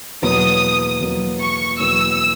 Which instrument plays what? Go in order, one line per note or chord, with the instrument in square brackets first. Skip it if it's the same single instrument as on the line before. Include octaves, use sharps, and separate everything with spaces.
[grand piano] E2 B2 F#3 A#3 [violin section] D#6
[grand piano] E2 B2 F#3 A#3
[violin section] C#6
[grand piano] E2 B2 F#3 A#3 [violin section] E6